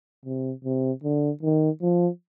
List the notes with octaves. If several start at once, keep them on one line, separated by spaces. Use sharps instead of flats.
C3
C3
D3
D#3
F3